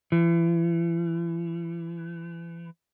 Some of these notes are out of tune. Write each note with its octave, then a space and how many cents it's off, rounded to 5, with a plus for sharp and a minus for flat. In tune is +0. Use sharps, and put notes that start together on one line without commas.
E3 +35